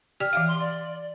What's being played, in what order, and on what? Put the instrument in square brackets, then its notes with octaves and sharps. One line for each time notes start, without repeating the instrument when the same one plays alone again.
[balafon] G4 D5 G5 [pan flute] F6
[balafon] E3 E5 F5
[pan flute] C6
D5